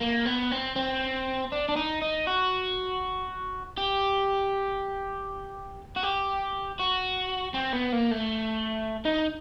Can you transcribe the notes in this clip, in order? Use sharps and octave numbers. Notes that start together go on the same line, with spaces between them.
A#3
B3
C4
C4
D4
D4
D#4
D#4
F#4
G4
F#4
G4
F#4
C4
B3
A#3
A3
D#4